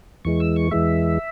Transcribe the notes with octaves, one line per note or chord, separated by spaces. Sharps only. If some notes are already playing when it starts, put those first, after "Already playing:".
E2 E3 G#3 C#6
E6
C#6
E2 E3 G#3 E5